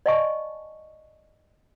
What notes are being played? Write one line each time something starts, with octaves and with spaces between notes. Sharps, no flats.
D5 D#5 F5 G#5 A5 C#6